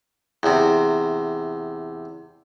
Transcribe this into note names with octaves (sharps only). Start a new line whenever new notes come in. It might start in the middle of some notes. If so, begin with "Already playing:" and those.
E2 C3